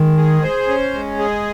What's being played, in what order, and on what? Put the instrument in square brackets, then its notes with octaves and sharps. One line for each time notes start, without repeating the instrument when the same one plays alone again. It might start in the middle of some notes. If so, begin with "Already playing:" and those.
Already playing: [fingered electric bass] D#3 [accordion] G#3
[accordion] G#4
C5
C#4
G#3
G#4